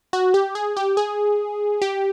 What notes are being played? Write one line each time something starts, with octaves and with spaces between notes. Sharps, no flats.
F#4
G4
G#4
G4
G#4
G4